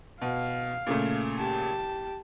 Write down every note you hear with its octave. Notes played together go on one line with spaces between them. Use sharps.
B2 F5
A#2 C#3 A3
G4 A5